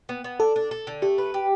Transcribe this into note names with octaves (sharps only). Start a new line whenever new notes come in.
B3
B3
D4 A4
D4
A4
D3
A3 G4
B4
G4